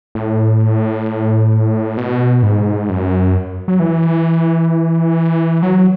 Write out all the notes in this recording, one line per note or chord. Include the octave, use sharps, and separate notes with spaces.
A2
B2
G#2
F#2
F#3
E3
F#3